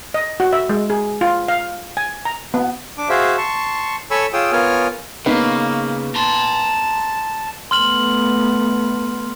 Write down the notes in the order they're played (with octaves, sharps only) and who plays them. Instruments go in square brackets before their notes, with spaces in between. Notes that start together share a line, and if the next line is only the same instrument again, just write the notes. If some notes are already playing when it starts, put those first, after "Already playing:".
[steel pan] D#5
F#4
E5
G#3
G#4
F4
F5
G#5
A#5
B3
[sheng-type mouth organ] D4 D6
F#4 G#4 C5 E5 F5
A5 C6 C#6
A4 C#5 G#5 B5 C#6 E6
F4 G#4 C#5 G5 D#6 E6
B3 F4 A#4 C#5 G#5 F6
[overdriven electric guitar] C#3 [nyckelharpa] A#3 [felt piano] B3 D#4 B4
[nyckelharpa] A5 [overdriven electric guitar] A#5 C6
[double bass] A3 B3 [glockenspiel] C6 F6 F#7